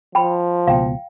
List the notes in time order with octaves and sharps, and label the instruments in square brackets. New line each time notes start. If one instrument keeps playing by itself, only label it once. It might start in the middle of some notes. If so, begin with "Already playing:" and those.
[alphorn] F3 [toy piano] G5 B5
[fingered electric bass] C#2 B2 [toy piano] F5 G5